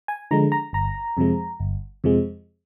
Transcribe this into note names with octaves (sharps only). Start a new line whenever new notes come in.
G#5
D3 F3 G#3 A#5
A#5
G1 A#5
F2 C3 F3 G#3
G1
F2 C3 F3 G#3